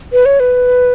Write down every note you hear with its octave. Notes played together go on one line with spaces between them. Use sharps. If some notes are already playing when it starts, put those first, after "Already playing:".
B4
C#5
B4